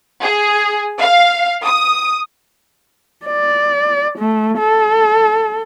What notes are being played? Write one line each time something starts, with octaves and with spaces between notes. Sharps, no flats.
G#4
F5
D#6
D5
A3
A4